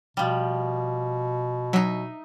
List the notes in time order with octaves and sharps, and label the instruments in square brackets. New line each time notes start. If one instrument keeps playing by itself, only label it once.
[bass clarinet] B2 [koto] F3 G3
[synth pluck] F#3 [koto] D#4 E5